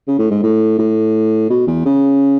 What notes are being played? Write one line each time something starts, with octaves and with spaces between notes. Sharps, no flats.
C#3
A2
G#2
A2
A2
B2
E2
C#3